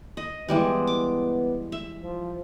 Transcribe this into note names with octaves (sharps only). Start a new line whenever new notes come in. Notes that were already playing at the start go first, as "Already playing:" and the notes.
D#5
E3 G3 G#3 B3
D6
E5
F3